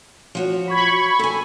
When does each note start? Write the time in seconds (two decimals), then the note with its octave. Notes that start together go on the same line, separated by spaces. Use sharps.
0.35 F3 F#4 C#5
0.68 B5 C#6 G#6
1.19 A4 G#5